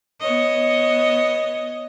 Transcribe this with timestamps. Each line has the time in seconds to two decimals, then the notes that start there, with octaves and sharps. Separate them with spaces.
0.20 B3 C#5 D#5